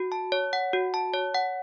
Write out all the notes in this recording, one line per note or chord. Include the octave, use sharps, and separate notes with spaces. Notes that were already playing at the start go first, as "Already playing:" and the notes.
Already playing: F#4
A5
C#5
F#5
F#4
A5
C#5
F#5